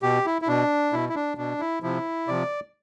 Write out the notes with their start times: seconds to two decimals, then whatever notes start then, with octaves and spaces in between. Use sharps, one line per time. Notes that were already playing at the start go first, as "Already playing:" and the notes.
0.02 B2 G4
0.26 E4
0.42 E4
0.48 B2 D4
0.93 B2 E4
1.09 E4
1.15 D4
1.37 B2 D4
1.60 E4
1.82 C3 F3 E4
2.28 C3 F3 D5